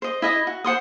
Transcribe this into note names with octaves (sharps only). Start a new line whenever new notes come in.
C5 D#5
E4 D#5 D#6
F#4
C5 F#5 C6 D#6